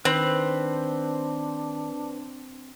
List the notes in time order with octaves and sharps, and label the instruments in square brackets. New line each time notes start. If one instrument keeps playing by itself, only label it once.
[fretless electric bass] D#3 [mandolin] C4 [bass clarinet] D4 [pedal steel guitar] B4 C5 B5